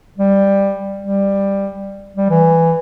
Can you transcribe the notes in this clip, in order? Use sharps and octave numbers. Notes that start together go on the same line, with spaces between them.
G3
G3
G3
E3